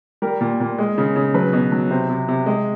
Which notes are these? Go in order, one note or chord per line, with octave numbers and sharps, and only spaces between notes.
G3 A#4
A#2
A#2
G#3
C#3
C#3
F#3 B4
B2
F#3
C3 C5
C3
C3
G#3